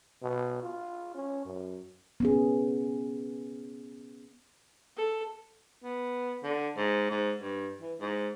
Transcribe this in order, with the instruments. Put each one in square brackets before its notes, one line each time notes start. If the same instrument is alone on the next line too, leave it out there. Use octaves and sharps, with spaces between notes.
[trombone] B2
F4
C#4
F#2
[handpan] B3 C#4 G#4
[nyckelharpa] A4
[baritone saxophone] B3
D3
G#2
G#2
G2
E3
G#2